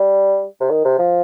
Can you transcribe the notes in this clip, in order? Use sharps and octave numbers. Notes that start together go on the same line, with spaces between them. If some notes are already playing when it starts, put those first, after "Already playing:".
Already playing: G3
C3
D#3
C3
F3